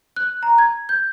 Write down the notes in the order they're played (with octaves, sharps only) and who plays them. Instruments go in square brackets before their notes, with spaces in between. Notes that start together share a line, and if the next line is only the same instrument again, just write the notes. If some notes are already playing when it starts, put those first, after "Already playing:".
[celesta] F#6
A#5
G#6
G6